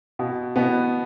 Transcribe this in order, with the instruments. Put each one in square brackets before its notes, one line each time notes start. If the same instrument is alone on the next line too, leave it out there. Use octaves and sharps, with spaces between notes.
[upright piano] B2
B2 B3